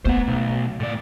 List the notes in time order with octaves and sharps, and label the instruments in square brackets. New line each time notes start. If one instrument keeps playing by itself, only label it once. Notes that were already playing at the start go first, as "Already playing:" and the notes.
[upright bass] A3 B3 [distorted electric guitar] C5 F#5
[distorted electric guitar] B1
A2 D5